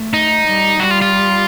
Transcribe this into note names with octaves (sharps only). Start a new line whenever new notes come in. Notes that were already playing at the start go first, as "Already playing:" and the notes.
Already playing: A3
D#4
G3
G3 F#4
F4
F4